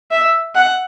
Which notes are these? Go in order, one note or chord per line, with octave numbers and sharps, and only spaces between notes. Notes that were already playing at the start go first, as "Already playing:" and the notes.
E5
F#5